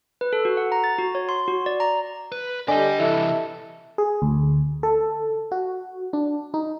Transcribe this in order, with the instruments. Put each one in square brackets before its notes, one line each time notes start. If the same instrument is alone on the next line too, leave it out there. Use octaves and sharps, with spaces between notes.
[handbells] B4
A4
F#4
F#5
A#5
A6
F#4
C#5
C6
F#4
D5
A#5
[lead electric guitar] B4
[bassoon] D3 [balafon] D4 G#5 [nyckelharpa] G4 D#5 [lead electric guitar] D5 G5
[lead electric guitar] C3 E3 [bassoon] E4 [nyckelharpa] A4
[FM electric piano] G#4
D2
A4
F#4
D4
D#4